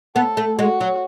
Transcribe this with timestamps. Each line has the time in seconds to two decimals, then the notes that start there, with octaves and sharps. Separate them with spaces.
0.16 B3 A4
0.37 A3
0.59 G#3 F#4
0.81 F#3